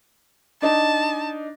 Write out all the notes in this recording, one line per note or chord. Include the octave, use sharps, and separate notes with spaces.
D4 D#4 A5